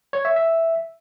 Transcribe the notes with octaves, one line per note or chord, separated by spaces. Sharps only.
C#5
E5
E5